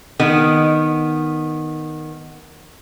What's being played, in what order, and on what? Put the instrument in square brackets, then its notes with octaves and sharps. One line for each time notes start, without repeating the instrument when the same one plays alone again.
[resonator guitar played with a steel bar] D#3 B3